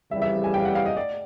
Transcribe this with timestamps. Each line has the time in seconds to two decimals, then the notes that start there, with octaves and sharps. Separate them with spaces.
0.11 F2 C#3 E3 G3 E5
0.22 E5
0.44 G#5
0.54 G5
0.59 F5
0.65 F#5
0.75 F5
0.86 D#5
0.97 D5